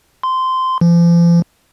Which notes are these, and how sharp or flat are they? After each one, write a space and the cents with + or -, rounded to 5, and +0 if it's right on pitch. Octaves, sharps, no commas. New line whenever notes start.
C6 -15
F3 -40